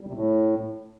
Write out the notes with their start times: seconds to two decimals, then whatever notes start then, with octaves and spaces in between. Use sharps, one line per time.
0.01 G3
0.08 C3
0.14 A2